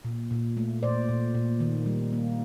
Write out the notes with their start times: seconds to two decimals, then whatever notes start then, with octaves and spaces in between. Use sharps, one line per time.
0.05 A#2
0.31 A#2
0.57 A3
0.83 A#2 C5 D5
1.09 A#2
1.35 A#2
1.60 D#3
1.86 G3
2.13 A#3